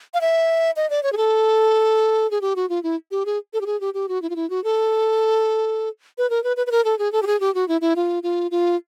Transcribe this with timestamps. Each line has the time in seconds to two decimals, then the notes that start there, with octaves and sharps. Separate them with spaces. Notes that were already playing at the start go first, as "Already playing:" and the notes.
0.14 F5
0.21 E5
0.76 D#5
0.90 D5
1.03 C#5
1.13 G#4
1.17 A4
2.31 G#4
2.41 G4
2.56 F#4
2.69 F4
2.83 E4
3.11 G4
3.26 G#4
3.53 A4
3.61 G4
3.66 G#4
3.81 G4
3.94 G4
4.09 F#4
4.22 E4
4.30 F4
4.36 E4
4.50 F#4
4.64 A4
6.18 B4
6.30 A#4
6.44 B4
6.57 B4
6.67 B4
6.71 A#4
6.85 A4
6.99 G#4
7.12 A4
7.22 G4
7.27 G#4
7.40 G4
7.55 F#4
7.68 E4
7.81 E4
7.96 F4
8.23 F4
8.51 F4